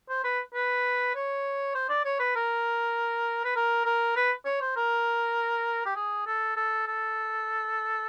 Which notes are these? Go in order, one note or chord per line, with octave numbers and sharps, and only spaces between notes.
C5
B4
B4
C#5
C5
D5
C#5
B4
A#4
B4
A#4
A#4
B4
C#5
C5
A#4
G4
G#4
A4
A4
A4